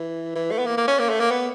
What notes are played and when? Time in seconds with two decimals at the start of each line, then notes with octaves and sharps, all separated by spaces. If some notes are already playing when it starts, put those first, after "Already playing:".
Already playing: E3
0.35 E3
0.51 A3
0.59 B3
0.66 A#3
0.77 A#3
0.88 C#4
0.99 A#3
1.10 A3
1.20 A#3
1.31 B3